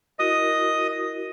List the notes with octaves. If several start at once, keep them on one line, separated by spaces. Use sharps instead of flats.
E4 F#4 A#4 D#5 D#6